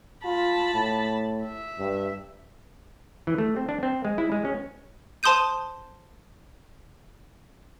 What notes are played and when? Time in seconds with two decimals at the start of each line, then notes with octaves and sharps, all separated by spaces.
0.25 F4 A5 B5
0.75 A2
1.45 E5
1.79 G2
3.27 E3
3.38 A3
3.56 C4
3.69 D4
3.83 C4
4.05 G#3
4.18 E4
4.32 G#3
4.45 C#4
5.23 C5 A5 C6 D#6 G6 D#7